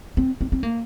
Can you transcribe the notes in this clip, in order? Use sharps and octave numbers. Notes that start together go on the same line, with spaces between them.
C4
C4
C4
A#3